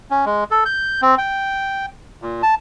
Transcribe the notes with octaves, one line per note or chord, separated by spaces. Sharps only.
C#4
G#3
A4
G6
C4
G5
A#2
A5